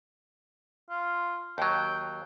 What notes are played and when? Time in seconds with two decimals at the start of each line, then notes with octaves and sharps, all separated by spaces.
0.90 F4
1.58 D#2 F#3 G5